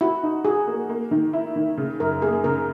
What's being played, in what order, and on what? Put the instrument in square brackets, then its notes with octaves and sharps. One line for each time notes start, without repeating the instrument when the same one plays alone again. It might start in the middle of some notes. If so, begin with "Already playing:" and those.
[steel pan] E4 [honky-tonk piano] F#4
[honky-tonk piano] D#4
[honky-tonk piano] F#4 [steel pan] G#4
[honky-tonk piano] A#3
A#3
D#3
E4
D#3
C#3
[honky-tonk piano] F#2 [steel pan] A#4
[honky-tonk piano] A#3 [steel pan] G#4
[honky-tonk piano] C#3 [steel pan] A#4